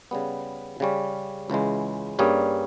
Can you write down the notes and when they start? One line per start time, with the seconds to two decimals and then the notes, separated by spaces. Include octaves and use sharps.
0.11 C#3 G3 B3
0.80 C#3 G3 C#4
1.50 C#2 C#3 E3 G#3
2.19 G2 G3 A#3 C#4 G#4